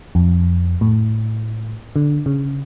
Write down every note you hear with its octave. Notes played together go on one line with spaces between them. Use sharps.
F2
A2
D3
C#3